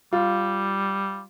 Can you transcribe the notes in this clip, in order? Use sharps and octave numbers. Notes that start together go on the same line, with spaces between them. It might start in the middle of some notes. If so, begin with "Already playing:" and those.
G3 F4